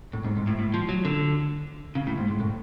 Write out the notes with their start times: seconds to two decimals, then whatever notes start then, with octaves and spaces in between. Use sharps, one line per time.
0.13 A2
0.24 G#2
0.37 G#2
0.47 A2
0.59 A2
0.74 F3
0.89 F#3
1.05 D3
1.95 C#3
2.07 A2
2.18 G#2
2.28 G#2
2.40 A2